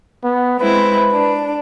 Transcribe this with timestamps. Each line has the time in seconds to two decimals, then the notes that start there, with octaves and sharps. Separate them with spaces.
0.24 B3
0.60 G#3 C4 E4 B4
1.11 D4